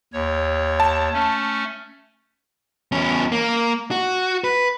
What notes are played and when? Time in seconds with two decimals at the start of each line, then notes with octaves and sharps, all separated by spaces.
0.13 D#2 C#5
0.80 A5
1.13 A3 C#4
2.92 E2 C#4
3.32 A#3
3.91 F#4
4.44 B4